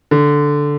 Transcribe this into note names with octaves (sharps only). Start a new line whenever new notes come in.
D3